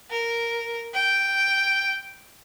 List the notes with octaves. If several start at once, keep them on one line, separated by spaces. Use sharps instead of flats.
A#4
G5